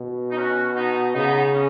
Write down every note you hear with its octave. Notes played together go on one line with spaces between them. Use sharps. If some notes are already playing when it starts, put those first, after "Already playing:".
Already playing: B2
D#4
C#4 F#4
B3 D#4
C#3 B3 D#4
C#4